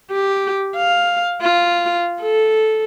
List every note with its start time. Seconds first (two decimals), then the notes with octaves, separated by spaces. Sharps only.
0.12 G4
0.76 F5
1.41 F4
2.22 A4